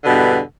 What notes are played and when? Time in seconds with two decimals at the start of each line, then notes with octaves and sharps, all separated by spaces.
0.03 D3
0.06 B2
0.09 G2
0.11 E2